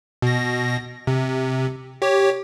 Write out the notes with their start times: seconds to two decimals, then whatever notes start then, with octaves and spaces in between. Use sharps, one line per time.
0.22 B2 A#6
1.07 C3
2.02 G4 C#5